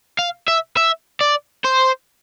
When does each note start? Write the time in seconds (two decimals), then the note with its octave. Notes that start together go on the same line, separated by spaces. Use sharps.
0.19 F5
0.48 E5
0.77 E5
1.21 D5
1.64 C5